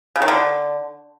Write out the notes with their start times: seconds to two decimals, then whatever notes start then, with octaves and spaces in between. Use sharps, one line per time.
0.16 C#3
0.22 D#3
0.28 D3